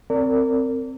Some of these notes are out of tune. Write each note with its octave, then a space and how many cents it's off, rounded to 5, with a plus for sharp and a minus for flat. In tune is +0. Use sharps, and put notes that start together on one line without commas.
C4 +0 A#4 -35 D5 -25